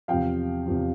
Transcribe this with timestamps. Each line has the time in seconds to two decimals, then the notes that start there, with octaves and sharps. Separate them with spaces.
0.08 E2 C3 F3 F5 G5
0.66 E2 C3 F3